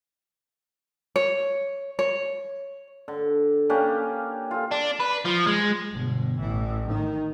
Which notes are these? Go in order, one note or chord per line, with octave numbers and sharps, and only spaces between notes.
C#5
C#5
D3
A#3 C#4 D4 G4
F4 A4
D4
B4
F3
G#3
G1 B2
A1 E3
D#3 D#4